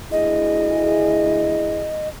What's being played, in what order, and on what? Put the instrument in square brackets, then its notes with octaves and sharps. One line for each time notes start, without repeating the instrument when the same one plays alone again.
[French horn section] D2 E4 G#4 [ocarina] D#5